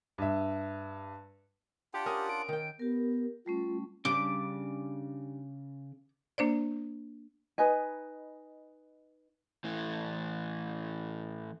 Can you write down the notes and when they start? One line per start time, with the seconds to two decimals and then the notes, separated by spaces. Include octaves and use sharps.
0.18 G2 E5
1.94 D4 F4 G4 F#5
2.06 C#4 A#4 D#6
2.29 D7
2.49 D#3 G5
2.79 B3 G4 A#4
3.46 G3 A3 C#4 F4
4.05 C#3 G3 D4 D6
6.38 A#3 D4 C5 D5
7.58 D#4 B4 D#5 G#5
9.64 A2 E3